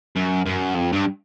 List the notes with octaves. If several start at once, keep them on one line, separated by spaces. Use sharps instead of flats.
F#2
F#2
F2
G2